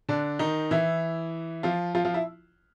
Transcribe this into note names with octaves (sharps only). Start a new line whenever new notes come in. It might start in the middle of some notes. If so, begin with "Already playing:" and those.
D3 D4
D#3 D#4
E3 E4
F3 F4
F3 F4
F3 F4
E4